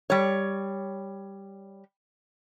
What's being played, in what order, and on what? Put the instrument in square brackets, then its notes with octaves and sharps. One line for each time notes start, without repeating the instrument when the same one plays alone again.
[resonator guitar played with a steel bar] G3 C#5